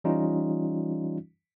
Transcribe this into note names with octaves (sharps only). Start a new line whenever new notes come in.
E3 G3 C#4 D#4 F4